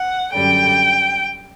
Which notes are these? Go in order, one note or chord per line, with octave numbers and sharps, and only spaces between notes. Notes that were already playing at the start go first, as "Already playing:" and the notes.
Already playing: F#5
F#2 D3 G3 G5